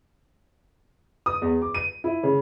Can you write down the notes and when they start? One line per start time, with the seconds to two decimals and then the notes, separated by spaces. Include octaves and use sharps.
1.26 D#6
1.42 E2
1.62 D6
1.74 D#7
2.04 E4
2.23 C#3